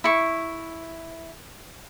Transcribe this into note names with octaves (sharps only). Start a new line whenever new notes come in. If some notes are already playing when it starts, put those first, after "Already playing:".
E4 C#6